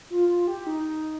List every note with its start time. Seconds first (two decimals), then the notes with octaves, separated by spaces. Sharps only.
0.10 F4
0.29 F4
0.47 G4
0.67 D#4